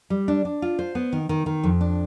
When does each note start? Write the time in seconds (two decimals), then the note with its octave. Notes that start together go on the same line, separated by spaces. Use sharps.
0.10 G3
0.28 D4
0.45 D4
0.62 F4
0.79 C5
0.95 B3
1.12 D#3
1.29 D#3
1.46 D#3
1.63 F2
1.81 D4